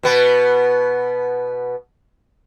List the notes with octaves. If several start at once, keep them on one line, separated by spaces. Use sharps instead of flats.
B2 B3